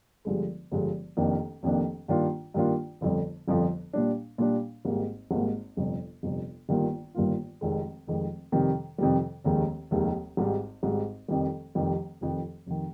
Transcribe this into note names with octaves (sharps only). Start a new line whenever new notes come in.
G1 G2 D3 F3 G#3
G1 G2 D3 F3 G#3
F1 F2 D#3 A#3 D4
F1 F2 D#3 A#3 D4
G2 D#3 A#3 D4 F4
G2 D#3 A#3 D4 F4
G1 F2 D3 F3
G1 F2 D3 F3
A#2 G3 D4
A#2 G3 D4
G#1 G#2 G3 A#3
G#1 G#2 G3 A#3
G1 F2 C3
G1 F2 C3
G1 G2 D#3 A#3 F4
G1 G2 D#3 A#3 F4
F1 F2 D#3 G#3
F1 F2 D#3 G#3
F2 C3 D#3 G3
F2 C3 D#3 G3
F1 D#2 D#3 G#3
F1 D#2 D#3 G#3
G#1 G#2 G3
G#1 G#2 G3
F1 F2 D#3 G3
F1 F2 D#3 G3
F1 F2 D#3
F1 D#3